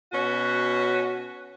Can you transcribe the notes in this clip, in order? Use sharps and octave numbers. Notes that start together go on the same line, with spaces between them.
B2 C#4 F#4